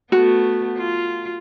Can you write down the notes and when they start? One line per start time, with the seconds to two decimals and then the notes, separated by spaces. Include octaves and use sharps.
0.12 A3 B3 F#4
0.77 F4